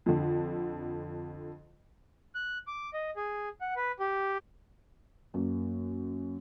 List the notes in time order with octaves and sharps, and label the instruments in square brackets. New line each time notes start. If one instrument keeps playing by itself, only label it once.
[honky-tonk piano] F2 D3
[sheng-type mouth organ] F#6
D6
D#5
G#4
F#5
B4
G4
[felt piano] F#2 A#3